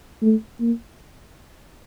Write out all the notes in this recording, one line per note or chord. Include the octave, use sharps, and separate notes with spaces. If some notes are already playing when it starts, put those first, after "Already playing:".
A3
A#3